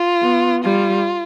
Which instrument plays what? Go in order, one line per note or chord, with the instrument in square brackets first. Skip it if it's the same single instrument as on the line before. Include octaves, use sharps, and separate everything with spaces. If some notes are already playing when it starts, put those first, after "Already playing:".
Already playing: [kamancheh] F4
[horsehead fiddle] B3
[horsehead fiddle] G3 [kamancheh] F4